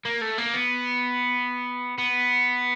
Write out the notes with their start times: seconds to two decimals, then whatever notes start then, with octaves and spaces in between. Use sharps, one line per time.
0.05 A#3
0.22 A3
0.38 A#3
0.54 B3
1.98 B3